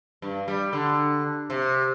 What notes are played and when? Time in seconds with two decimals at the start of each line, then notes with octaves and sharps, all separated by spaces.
0.22 G2
0.48 G3
0.73 D3
1.50 C3